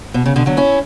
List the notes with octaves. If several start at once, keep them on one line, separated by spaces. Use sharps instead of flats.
B2
C#3
B2 D3
D3 F#3
C#4 E4